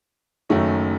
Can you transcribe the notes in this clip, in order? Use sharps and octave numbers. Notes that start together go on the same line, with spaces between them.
F#1 F#2 D#3 A3 C#4